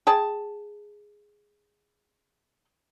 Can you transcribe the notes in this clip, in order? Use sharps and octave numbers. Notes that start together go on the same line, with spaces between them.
G#4 G5 A5